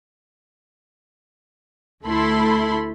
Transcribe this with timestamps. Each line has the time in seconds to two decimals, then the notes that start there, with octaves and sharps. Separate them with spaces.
2.04 D2 A3 E4 A4 B5 C6